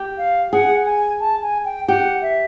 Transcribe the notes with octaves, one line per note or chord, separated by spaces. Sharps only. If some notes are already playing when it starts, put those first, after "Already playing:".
Already playing: G4
F5
G#4 F#5
G#5
A5
G#5
G5
G4 F#5
E5